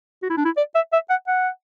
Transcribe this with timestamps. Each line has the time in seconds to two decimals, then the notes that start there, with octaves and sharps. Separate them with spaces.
0.22 F#4
0.30 E4
0.37 D4
0.45 E4
0.57 D5
0.75 E5
0.92 E5
1.09 F#5
1.27 F#5